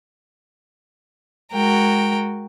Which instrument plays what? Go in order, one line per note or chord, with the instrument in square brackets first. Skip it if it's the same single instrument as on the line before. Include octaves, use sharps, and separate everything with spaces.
[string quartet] G#3 F#4 [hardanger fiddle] A#4 G5